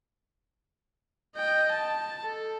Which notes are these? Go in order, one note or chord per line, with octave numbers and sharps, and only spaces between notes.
D#5 G5
A5
A4